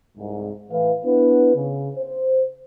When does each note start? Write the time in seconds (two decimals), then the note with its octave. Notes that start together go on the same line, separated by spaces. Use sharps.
0.17 C2 G#2
0.71 A2 E3 B4 F5
1.04 B3 D4 E4 B4
1.55 C#3
1.97 C5